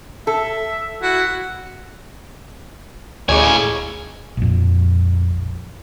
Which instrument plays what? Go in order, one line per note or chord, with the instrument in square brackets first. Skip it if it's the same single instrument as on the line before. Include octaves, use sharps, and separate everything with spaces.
[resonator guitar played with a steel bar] A4 [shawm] E5
[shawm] E4 [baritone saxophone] F#4
[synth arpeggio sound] D2 D#5 D6 [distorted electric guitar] A2 G#5 [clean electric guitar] G#4 C#5
[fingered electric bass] A#1 F2